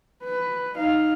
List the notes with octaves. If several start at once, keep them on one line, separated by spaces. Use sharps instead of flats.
B4
D#4 F5